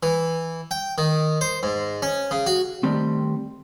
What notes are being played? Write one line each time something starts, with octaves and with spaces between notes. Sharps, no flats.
E3
G5
D#3
C5
G#2
C#4
C#3
F#4
D#3 G3 A3 C4